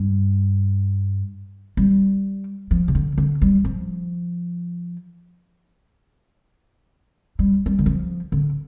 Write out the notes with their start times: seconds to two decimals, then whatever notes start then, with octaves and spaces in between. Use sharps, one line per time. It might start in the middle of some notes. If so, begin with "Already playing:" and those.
Already playing: G2
1.77 G3
2.71 F3
2.88 C3
2.95 D3
3.18 D3
3.42 G3
3.65 F3
7.39 G3
7.66 G3
7.79 D3
7.86 F3
8.32 D3